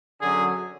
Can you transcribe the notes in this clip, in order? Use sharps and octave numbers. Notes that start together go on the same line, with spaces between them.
F#2 D3 F#3 G#4